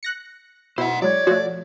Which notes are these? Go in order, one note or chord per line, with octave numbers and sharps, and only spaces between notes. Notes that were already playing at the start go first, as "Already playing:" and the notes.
F#6 A#6 C#7
B2 E4 C5 F#5
F#3 G#3 C#5 D5
F3 A3 F#4